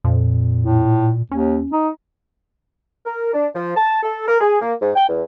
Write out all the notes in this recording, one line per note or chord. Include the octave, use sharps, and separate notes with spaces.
F2 A#2
A2
D#2 C#4
D#4
A#4
D4
F3
A5
A4
A#4
G#4
A#3
G#2
G5
E2